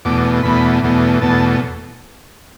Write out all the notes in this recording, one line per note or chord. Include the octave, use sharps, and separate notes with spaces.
E2 B2 A3 D6
E2 B2 A3 B5
E2 B2 A3
E2 B2 A3 A5